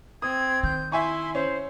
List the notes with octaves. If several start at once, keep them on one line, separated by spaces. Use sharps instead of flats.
C4 D#6 G#6
D#3 G6
E4 E5 G#5 C6 C#6
C#4 C5